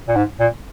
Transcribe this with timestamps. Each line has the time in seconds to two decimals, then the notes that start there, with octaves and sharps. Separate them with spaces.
0.08 A#2
0.16 G#2
0.40 A#2